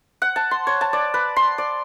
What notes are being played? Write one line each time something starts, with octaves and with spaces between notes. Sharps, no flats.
F#5
A5
C6
C#5
A5
D5
B4
C6
D5